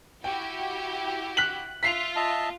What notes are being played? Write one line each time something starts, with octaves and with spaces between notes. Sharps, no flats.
E4 F#4 G4 G5
F#6 B6 F#7
F4 E5 B6 C7 F7
D#5 E5 A5